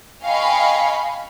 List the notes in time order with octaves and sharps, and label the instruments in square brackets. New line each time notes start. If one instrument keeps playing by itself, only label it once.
[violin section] D#5 F5 G5 G#5 B5 C#6